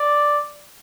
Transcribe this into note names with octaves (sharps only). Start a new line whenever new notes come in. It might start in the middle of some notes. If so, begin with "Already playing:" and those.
Already playing: D5